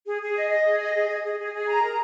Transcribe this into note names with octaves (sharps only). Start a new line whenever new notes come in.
G#4
G#4
D#5
D#5
G#4
D#5
G#4
G#4
G#4
G#4
G#4
A#5
A#4